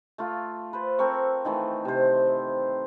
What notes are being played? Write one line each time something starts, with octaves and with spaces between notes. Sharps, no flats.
A3 F4
B4 C5
C4 A4 A#4 C#6
D#3 E3 A3
C3 C5